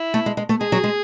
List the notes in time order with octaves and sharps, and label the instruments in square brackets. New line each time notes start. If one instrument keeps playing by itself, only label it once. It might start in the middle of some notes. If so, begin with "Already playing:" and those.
Already playing: [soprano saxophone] E4
[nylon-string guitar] A3
G#3
G#3
A3
[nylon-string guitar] G#3 [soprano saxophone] G#4
[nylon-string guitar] F#3
G#3